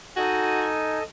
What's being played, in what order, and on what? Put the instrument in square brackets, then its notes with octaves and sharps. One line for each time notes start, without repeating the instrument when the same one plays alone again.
[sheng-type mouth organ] D#4 A4 D#5 G#5 [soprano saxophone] F#4